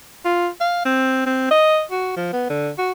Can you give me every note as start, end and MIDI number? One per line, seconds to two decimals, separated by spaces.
0.25 0.48 65
0.60 0.83 77
0.85 1.23 60
1.26 1.46 60
1.51 1.82 75
1.91 2.16 66
2.16 2.30 53
2.33 2.49 59
2.49 2.70 50
2.78 2.92 66